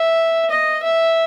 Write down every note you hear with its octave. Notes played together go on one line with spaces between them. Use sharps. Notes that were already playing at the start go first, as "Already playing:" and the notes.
Already playing: E5
D#5
E5